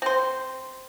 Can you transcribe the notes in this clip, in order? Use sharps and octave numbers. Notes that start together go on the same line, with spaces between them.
C4 C5